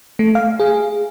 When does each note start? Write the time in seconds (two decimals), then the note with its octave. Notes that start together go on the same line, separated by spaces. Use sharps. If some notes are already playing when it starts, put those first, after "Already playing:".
0.19 A3
0.35 F5
0.60 G#4